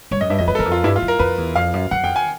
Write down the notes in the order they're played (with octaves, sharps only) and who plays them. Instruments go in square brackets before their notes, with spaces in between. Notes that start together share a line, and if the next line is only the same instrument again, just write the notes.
[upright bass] G2 [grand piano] C#5
[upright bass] F#2 [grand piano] D#5
[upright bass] G2 [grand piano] E5
[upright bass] F2 [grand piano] D#5
[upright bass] G2 [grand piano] B4
[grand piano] A4
[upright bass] E2 [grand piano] A#4
[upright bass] F2
[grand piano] F4
[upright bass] G2 [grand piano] E4
[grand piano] F4
[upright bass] F#2
[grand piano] A#4
[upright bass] F2 [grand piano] B4
[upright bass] E2
[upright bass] F2 [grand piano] F5
[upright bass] F#2
[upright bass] F#2 [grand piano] F#5
[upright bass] F2 [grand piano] G5
[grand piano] G#5